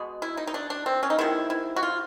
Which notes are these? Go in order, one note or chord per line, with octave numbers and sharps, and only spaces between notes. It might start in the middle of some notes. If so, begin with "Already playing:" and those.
Already playing: B2 G#3 B3
E4
D#4
D#4
D4
D4
C4
C#4
D#4
C3 D#3 G#3 B3 E4
E4
F#4
F4